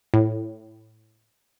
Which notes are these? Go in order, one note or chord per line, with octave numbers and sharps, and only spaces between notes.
A2